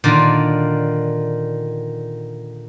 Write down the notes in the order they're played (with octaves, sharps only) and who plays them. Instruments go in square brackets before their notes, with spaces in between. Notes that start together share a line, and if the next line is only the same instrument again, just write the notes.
[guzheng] A#2 D3 D#3